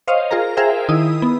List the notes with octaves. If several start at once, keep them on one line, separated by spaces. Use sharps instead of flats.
C5 C#5 D#5 F5
F4 G#4 A#4 A#5
G#4 A#4 C5 E5 F5 G5
D#3 E4 D#6
B3